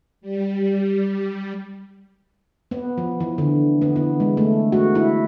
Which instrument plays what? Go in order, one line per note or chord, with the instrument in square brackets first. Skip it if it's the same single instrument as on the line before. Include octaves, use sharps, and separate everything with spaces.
[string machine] G3
[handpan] B3
F3
E3
D3
B3
E3
G#3
A3
F#4
E4